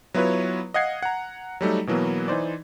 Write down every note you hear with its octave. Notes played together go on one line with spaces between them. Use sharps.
F#3 B3 E4 F4 B4 C#5
D#5 F5 F#5 G#6 C7
F#5 A#5
F#3 G3 A3 D#4
B2 E3 F#3 A#3 B3
E3 D#4 C5 D5